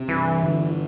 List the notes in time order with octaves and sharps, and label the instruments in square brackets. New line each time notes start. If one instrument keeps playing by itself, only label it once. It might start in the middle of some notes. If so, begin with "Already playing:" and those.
Already playing: [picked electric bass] C3
[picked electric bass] G2 [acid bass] E3
[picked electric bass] D3